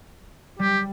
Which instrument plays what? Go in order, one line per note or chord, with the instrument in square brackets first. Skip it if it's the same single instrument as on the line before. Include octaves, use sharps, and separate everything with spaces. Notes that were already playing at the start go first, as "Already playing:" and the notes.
[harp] G3 [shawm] G4